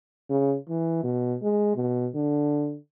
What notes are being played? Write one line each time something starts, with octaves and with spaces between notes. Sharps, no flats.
C#3
E3
B2
G#3
B2
D3